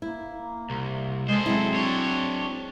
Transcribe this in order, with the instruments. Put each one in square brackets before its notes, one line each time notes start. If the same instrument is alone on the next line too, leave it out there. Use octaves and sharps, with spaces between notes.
[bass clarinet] A#3 [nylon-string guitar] E4
[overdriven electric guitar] C2
[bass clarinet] G#3 [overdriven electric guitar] A4 C5
[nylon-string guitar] F#3 G#3 E4 [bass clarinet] C4
[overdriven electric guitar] D4 C#5